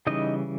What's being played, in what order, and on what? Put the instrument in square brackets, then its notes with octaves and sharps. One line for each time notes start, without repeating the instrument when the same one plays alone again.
[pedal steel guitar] C#3 E3 G3 D#4 D#5